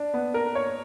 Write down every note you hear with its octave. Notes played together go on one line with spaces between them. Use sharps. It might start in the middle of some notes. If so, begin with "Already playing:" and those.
Already playing: D4
B3
A#4
C#5